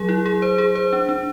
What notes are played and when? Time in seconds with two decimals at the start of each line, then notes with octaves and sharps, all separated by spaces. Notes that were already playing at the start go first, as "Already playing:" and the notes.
Already playing: F#3 G#4
0.09 E4
0.26 G#4
0.42 C5
0.58 G#4
0.75 C5
0.93 D4
1.09 D4